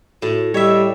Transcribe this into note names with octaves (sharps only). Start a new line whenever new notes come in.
A2 F#4
G3 C#5 D#5 E5